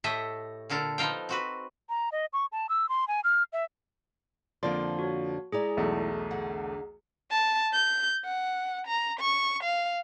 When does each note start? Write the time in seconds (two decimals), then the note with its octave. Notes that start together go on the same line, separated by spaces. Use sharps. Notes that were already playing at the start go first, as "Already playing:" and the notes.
0.04 A2 A3 G4 A4 D#5 E5
0.70 A#2 D3 A4 A#4
0.98 F3 B3 D#4 F5 G5
1.29 C4 F#4 B4
1.89 A#5
2.12 D#5
2.33 C#6
2.52 A5
2.69 E6
2.89 C6
3.08 G#5
3.24 F6
3.53 E5
4.63 F2 D3 F3 A#3 D5 C6
4.99 F#4 C#5
5.52 G#3 E4 G#4 D5 A#5
5.77 B1 E2 A3
6.31 D3 F#5
7.31 A5
7.74 G6
8.25 F#5
8.87 A#5
9.20 C#6
9.64 F5